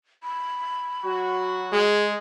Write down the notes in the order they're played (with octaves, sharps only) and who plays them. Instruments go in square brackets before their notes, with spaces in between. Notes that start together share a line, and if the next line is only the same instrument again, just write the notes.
[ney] B5
[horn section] F#3 F#4
[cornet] G#3 [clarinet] G#4